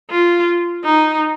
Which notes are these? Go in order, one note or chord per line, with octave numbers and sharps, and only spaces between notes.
F4
D#4